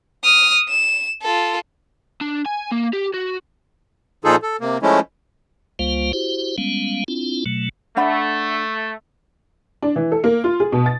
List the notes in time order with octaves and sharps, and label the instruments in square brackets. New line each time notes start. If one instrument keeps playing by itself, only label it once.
[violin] D#6 F6
E7
F4 A4
[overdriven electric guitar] D4
G#5
A#3
G4
F#4
[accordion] A#2 F3 D#4 F4 G#4 A4
A4
C3 A#3
F3 G#3 A3 C#4 E4
[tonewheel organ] C#2 G3 A#3 F4 C5 F5
E4 F#4 G4 C5
G3 G#3 B3 C#4 F5
C4 D4 E4 F4
B2 F#3 A3
[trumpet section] A3 [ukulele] D4 F#5 B5
[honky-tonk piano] D4
E3
A4
A#3
F4
G#4
B2
A6